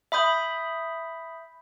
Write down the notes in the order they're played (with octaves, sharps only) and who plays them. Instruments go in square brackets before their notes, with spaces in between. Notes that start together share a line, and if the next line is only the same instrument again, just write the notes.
[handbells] E5 B5 D#6 G6